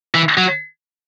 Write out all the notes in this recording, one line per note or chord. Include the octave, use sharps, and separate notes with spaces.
E3
F#3